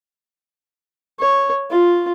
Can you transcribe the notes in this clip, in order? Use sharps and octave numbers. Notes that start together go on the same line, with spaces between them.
C#5
F4